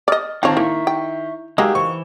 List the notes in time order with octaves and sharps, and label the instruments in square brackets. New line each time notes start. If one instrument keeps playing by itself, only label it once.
[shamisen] D5 D#5 [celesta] D#6 F6 A6
[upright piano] D#3 C4 [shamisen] F4 C#5 [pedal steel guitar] F#5 A5
[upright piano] D#3 [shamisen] A#3 [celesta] E4 [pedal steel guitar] E5 C#6
[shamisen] G5
[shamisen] D#3 F#3 A#3 [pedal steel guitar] G#3 [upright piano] G4 [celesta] D#6 E6
[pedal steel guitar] E3 [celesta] C5 [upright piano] C#6